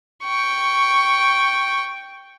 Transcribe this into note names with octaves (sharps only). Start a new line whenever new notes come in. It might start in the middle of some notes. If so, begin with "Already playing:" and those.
G5 C#6